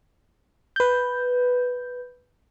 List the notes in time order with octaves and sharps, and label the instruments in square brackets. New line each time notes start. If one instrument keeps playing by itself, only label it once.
[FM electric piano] B4 G6